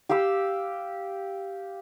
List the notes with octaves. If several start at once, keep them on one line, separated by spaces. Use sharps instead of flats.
G4 F5 G5 E6